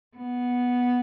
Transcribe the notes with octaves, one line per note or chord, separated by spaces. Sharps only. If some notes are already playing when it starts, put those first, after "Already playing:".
B3